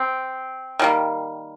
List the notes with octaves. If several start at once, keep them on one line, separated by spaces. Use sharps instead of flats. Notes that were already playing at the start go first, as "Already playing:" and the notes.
Already playing: C4
D#3 G3 A#3